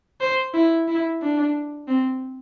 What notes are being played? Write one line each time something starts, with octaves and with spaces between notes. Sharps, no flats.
C5
E4
E4
D4
C4